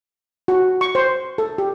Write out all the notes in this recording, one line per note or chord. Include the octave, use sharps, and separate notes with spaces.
F#4
C#6
C5
A4
G4